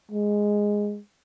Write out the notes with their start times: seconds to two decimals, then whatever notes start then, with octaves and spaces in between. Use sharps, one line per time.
0.11 G#3